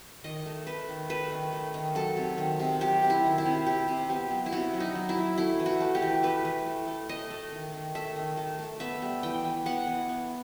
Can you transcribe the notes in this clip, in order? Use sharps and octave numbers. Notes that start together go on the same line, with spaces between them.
D#3 D#5
A3
A3 B4
D#3
A3 B4
D#3
A3
D#3
F#3 A4
C3
D#3
C3
F#3 G4
C3
E4
D#3
E4
C3
C3 G4
C3
B3 G4
F#3
E4
C3 F#4
F#3
D#4
F#3
E4
F#3
A3 E4
E3
F#4
A3
G4
E3
A3 B4
E3
A3
A3
A3 D#5
A3
D#3
D#3
A3 E5
D#3
A3
A3
B3 E5
G3
E3 G5
E3
B3 F#5
E3
B3